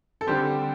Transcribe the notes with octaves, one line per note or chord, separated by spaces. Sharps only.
A4
D3 G3 C4 G4 C5